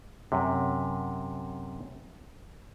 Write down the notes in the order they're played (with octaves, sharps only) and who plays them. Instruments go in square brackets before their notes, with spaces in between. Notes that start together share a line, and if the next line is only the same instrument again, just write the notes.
[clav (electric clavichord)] F#2 C3